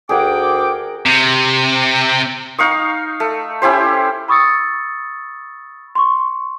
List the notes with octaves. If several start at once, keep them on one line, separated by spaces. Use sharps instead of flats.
D2 G#4 A#4 F#5 G5 D6
C3
D#4 F5 C#6 D#6
A3
C#4 E4 G4 C5
B5 C#6 D#6 E6 A6 C#7
C6 C#6